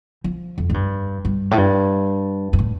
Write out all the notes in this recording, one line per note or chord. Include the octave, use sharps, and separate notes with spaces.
F3
F2
A2
G2
G2
A2
G2
G2
A2